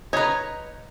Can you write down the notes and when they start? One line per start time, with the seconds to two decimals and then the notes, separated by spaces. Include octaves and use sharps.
0.13 D#4 B4 C#5 A#5